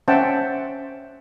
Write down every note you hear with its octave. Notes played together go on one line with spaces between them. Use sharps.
C#4 C5 E5 F#5 G5 A5